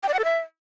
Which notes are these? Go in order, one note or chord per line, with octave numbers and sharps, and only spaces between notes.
G5
D5
F#5
A4
E5